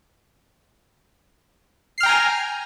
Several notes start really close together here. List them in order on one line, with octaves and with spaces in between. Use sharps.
C7 F6 G5 A#5 G#5